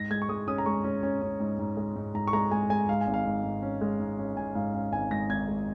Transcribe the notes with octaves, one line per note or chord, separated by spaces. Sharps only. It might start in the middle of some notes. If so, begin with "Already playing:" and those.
Already playing: G#2 A#6
G#3 G#6
C#6
G#3 D#6
C#4 D#6
A#5
G#3 C#6
C#4
C#4
C#4
G#2
G#2
G#3
G#2
G#2 A#5
C#6
G#3 A#5
G#3 G#5
G#3 G#5
G#2 F5
G#5
G#1
F5
G#2
G#2
C#4
G#3
G#2
C#4
G#2 G#5
G#2 F5
C#4 F5
G#1 G#5
G#2 A#6
G#1 G#6
G#3